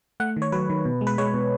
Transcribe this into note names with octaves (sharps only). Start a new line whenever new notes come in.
A3 F#5
D#3
C#5
F#3 B4
D#3
B2
G#3
B4
G#3 C#5
B2